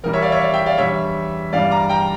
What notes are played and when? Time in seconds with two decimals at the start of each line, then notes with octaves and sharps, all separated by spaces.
0.04 E2 E3 G3 A#4
0.13 C#5 E5
0.22 D5 F5
0.32 C#5 E5
0.41 D5 F5
0.54 E5 G5
0.66 D5 F5
0.78 E2 D3 G3 C#5 E5
1.53 G2 E3 G3 D5 F5
1.71 A#5 D6
1.89 G5 A#5